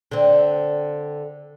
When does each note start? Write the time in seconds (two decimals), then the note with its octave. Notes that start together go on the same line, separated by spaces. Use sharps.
0.11 D3 C4